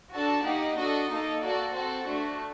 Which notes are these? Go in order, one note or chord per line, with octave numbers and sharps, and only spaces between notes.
D4 F#4 A4 A5
A#3 D#4 G4 F#5
D4 F#4 A4 D#5
A#3 D#4 A4
A#3 F#4 A4 D5
C4 F#4 A4 C5
A3 D4 F#4